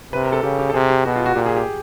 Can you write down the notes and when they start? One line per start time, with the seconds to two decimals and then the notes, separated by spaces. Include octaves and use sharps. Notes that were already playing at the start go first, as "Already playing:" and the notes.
0.13 C3 B4
0.23 A#4
0.32 A4
0.43 C#3 G4
0.59 G4
0.70 A4
0.74 C3 G#4
0.90 G4
1.05 B2 F#4
1.16 F4
1.26 F#4
1.35 A#2 G4
1.46 G#4
1.56 G4